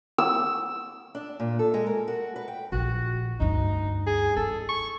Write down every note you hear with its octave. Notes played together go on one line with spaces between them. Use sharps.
E6
D4
A#2
A4
G#3
A#4
F#4
B4
G5
A#1 F#4
D2 G2 D#4
G#4
E4 A4
C#6